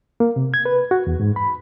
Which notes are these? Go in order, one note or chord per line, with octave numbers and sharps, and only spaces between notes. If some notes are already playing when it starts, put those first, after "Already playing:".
A#3
C3
G#6
B4
F#4
E2
G#2
B5